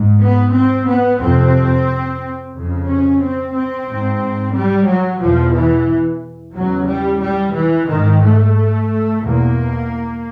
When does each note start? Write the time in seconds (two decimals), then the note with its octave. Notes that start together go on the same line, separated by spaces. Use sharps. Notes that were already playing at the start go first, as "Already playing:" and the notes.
Already playing: G#2
0.21 B3
0.53 C4
0.87 B3
1.20 F2 C3 C4
2.53 F2 C#3
2.87 C#4
3.21 C4
3.53 C4
3.88 G#2
4.54 G3
4.87 F#3
5.21 E2 B2 F3
5.54 E3
6.54 E2 C#3 F#3
6.87 G3
7.20 G3
7.54 E3
7.88 G#2 D#3
8.21 A3
9.20 E2 B2 A#3